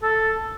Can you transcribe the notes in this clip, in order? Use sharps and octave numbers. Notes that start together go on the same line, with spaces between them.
A4